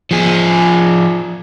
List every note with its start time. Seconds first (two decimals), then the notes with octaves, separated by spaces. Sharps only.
0.11 F3 G#4